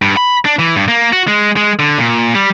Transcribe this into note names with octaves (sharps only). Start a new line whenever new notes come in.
G2
B5
D4
E3
G2
A#3
F#4
G#3
G#3
D3
A#2
G3